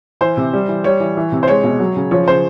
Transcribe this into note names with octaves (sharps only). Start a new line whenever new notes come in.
E3 C5
C3
G3
E3
G3 C#5
E3
E3
C3
C5
G#3 C#5
B2
F#3
C#3
F3 C#5
C#3 C5